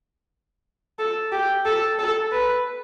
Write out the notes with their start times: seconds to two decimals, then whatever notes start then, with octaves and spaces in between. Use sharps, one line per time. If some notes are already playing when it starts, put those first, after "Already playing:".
0.99 A4
1.32 G4
1.66 A4
1.99 A4
2.32 B4